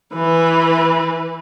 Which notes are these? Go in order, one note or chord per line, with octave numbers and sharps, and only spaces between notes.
E3 B4